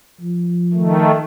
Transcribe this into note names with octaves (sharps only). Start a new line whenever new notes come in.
F3
D#3 A3